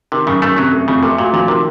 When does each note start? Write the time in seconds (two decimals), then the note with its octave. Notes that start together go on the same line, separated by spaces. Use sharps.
0.12 C3 D#3
0.27 F#2 C#3
0.42 F#2 A3
0.58 C3 F#3
0.73 A3
0.88 F2 C#3
1.03 C3 A3
1.18 A#2 F#4
1.33 A#2 F3
1.48 C3 D#3